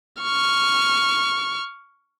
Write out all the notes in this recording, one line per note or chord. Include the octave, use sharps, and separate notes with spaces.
C#6 F6